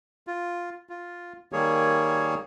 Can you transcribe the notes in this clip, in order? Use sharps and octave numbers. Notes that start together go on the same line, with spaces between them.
F4
F4
D#3 G3 A#3 G#4 C#5